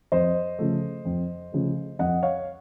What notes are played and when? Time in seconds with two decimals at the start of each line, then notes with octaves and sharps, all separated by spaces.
0.12 F2 C5 D#5
0.59 C#3 F3 A3
1.05 F2
1.52 C#3 F3 A3
1.99 F2 D#5 F#5
2.23 C#5 F5